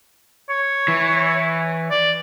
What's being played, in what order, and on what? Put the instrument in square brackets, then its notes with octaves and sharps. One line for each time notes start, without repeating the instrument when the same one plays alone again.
[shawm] C#5
[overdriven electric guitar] E3
[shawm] D5